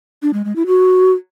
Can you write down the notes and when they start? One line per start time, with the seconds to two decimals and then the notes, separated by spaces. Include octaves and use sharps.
0.22 D4
0.33 G#3
0.45 G#3
0.56 E4
0.67 F#4